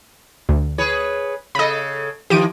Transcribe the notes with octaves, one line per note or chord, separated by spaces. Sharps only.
D2
G#4 B4 C#5
C#3 A4 D#5 B5
D#3 F3 G4 D7 D#7